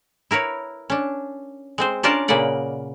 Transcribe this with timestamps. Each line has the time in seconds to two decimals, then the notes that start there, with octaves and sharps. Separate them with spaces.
0.31 E4 A#4 B4 C#5
0.90 C#4 D4
1.78 G#3 C4 C5
2.03 C#4 D4 F4 A#4 D5 A5
2.28 A#2 C#3 A#3 B4 D5 F#5